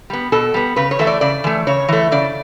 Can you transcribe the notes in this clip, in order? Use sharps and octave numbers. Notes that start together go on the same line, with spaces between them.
G3 B3
B2 A4
G3 B3
C#3 B4
C#5
E3 A3 E5
D5
C#3 D5
E3 A3
C#3 C#5
E3 A3
C#3 D5